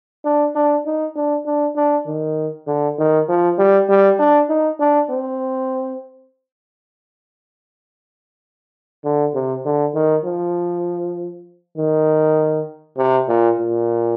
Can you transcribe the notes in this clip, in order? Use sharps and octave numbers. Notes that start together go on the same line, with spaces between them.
D4
D4
D#4
D4
D4
D4
D#3
D3
D#3
F3
G3
G3
D4
D#4
D4
C4
D3
C3
D3
D#3
F3
D#3
C3
A#2
A#2